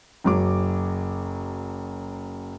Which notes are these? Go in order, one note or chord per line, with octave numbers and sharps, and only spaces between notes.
F#1 F#3 D6